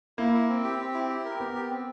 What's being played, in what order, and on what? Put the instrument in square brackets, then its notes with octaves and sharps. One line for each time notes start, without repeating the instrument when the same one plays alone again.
[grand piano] A#3 [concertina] E4
[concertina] E4
C4
G4
C4
E4
G4
A#4
[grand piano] B3 [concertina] G4
[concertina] G4
C4